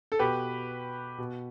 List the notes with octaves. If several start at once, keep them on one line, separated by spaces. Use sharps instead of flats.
A4
B2 G4 B4
B2